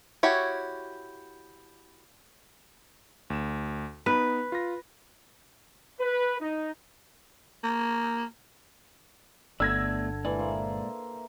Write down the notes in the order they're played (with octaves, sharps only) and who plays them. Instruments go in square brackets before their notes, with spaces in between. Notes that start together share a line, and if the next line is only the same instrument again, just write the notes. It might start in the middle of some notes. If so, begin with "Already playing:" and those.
[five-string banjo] E4 F#4 G4 C#5
[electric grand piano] D2 E7
[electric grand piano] B3 D#4 [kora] B4
[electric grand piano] F4 A#6
[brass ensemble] B4
D#4
[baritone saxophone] A#3
[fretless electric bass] G1 [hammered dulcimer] D3 [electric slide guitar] A3 B3 D5 [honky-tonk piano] E6 G#6 A#6
[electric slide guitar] A#2 G#3 D5 [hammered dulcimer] E3
[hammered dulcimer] A#3 C5 E5